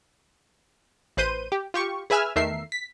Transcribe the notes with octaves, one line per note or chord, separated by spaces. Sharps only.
A1 B4 C5 G6 D#7
G4
F4 G4 C#6
G#4 B4 E5 G#5 E6 F6
E2 D#3 A3 A#4 E5 C7
B6